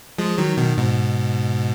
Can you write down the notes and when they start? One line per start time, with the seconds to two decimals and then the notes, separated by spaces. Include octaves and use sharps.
0.18 F3 G#3
0.38 D#3 F#3
0.57 B2 D#3
0.77 G#2 B2